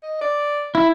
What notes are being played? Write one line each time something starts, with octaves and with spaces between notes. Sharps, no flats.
D#5
D5
E4